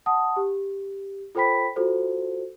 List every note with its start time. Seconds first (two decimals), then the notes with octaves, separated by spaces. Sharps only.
0.06 F#5 A5 D#6
0.36 G4
1.35 F4 A4 C5 G5 B5 B6
1.76 F4 F#4 A4 C5